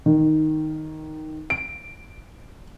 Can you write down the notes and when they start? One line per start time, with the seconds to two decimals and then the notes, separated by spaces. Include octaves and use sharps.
0.06 D#3
1.50 D7